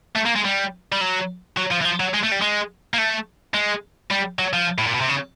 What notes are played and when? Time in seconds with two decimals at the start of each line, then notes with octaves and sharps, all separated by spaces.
0.15 A3
0.26 A#3
0.35 G#3
0.45 G3
0.92 G3
1.01 F#3
1.58 F#3
1.72 F3
1.82 E3
1.85 F3
2.00 F#3
2.14 G#3
2.23 A3
2.31 G3
2.42 G#3
2.94 A#3
2.98 A3
3.54 G#3
4.11 G3
4.39 F#3
4.53 F3
4.78 A2
4.86 A#2
4.94 B2
5.01 C3
5.09 C#3